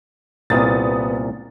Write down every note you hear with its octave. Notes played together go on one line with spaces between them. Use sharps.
C2 A#2 B3 D#6 A6